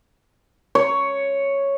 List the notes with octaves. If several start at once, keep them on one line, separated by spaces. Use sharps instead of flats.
C#5